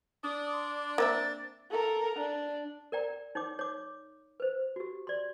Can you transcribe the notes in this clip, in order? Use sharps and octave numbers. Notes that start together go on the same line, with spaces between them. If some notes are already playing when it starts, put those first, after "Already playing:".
D4 D#6
C6
A#3 C4 E5 A6
A4 A#4
D4
A#4 D5 G5 A#5
D#4 C#5 G5 D6
C#5 D6
B4 C5
F#4 G4
D5 C6